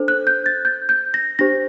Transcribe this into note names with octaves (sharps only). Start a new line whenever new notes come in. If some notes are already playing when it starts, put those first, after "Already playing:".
Already playing: D4 A4 C5
F#6
G6
A6
G6
G6
A#6
D4 G4 C5 A#6